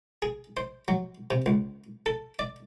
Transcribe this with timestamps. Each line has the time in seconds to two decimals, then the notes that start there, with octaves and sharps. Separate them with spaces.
0.22 G#4
0.57 C5
0.88 F#3
1.31 C3
1.46 C#2
2.06 A4
2.39 D5